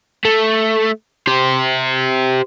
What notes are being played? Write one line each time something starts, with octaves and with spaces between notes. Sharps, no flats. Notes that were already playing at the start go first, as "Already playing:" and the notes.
A3
G4 C5